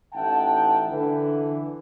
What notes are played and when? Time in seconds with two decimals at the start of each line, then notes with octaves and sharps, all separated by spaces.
0.14 A1 D#4 E5 F#5 G5 A5
0.90 D3 E3